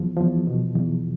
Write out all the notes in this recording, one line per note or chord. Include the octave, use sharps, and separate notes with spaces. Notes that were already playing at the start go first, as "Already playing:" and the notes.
Already playing: E2 F3
E2 F3
B2
E2